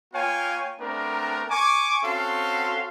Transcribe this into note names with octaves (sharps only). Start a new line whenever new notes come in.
A#3 F4 C#5 F5 G5 G#5
A3 B3 C4 D4 A#4
G#5 C#6 D6
C4 C#4 F#4 A4 F5 C6